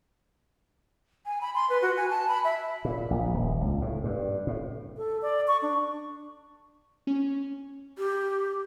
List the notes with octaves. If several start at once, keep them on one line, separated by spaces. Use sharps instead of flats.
G#5
B5
C6
B4
F#4
G#5
A5
B5
E5
A#2
A#1
D#1
C#2
A2
G2
A2
A4
D5
C#6
D4
C#4
G4